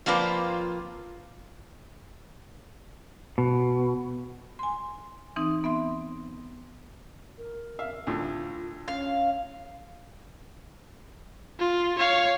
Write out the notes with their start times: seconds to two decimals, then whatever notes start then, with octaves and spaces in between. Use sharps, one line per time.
0.06 F3 A#3 C4 F4 B4 D5
3.38 B2
4.59 G#5 C6
5.36 E3 C4 D#4
5.64 B3 E5 C6
7.38 A#4
7.79 E5 F5
8.07 D2 A2 F4
8.88 C#4 F5
11.59 F4
11.98 C#5 F5